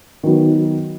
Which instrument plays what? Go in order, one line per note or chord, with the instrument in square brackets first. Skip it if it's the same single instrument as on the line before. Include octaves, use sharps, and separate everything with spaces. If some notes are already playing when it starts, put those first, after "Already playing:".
[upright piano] D#3 F#3 B3